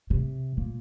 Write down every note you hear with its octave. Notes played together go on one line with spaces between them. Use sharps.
C3
A#2